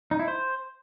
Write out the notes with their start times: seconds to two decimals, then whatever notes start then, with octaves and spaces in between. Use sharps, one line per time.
0.11 D#4
0.19 E4
0.28 C5